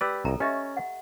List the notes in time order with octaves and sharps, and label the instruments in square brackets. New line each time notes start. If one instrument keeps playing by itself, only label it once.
[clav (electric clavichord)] G4 B4 D5 [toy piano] E6
[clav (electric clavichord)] C2 [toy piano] A4 A#5
[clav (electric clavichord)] C#4 [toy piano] G4 D#5 E5
[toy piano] F#5